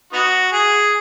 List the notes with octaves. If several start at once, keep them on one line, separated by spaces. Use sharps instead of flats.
B3 D#4 F#4
G#4